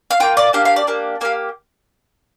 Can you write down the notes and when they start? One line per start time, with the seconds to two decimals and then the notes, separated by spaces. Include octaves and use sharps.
0.11 F5
0.20 A#3 F4 G5
0.37 D5
0.53 A#3 D4 G4 F5
0.65 F5
0.76 D5
0.87 A#3 D4 G4
1.21 A#3 G4 F5